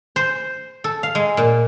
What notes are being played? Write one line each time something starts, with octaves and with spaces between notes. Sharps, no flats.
C5
A4
F5
G#3
A#2